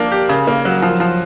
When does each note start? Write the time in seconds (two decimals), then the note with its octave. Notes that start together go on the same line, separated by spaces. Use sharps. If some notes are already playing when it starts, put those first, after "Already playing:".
Already playing: F3 A#3 D4
0.12 G4
0.29 C#3
0.47 A#3
0.65 F#3
0.82 F3
1.00 F3